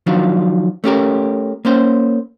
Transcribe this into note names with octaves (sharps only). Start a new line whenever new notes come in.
D#3 F3 F#3 D4 F4
A3 C#4 G4 A#4
A#3 C#4 C5